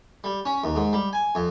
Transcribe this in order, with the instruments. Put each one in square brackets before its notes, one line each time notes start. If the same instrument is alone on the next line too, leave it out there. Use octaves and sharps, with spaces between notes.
[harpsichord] G3
C#4
D#2
G#2
G3
G#5
F2